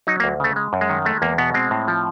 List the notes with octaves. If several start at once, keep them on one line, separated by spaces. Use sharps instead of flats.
F#3 D#4
A#3
D2
C#3 A3
G#3
F#2
G#3
D#3
G#3 A3
E2 A#3
B2 B3
G#3 C4
A2
F3